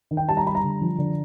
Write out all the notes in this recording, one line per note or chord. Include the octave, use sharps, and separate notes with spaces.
D#3
G5
G3 A5
A#5
G3 B5
A#5
D3
F3
D3